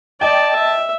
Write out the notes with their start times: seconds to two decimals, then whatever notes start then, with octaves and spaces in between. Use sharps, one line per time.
0.21 D5 D#5 G5 A5
0.56 E5